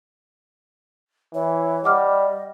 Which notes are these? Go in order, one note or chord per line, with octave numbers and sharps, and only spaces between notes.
E3 C#5
G3 D#5 F#5 D6 F6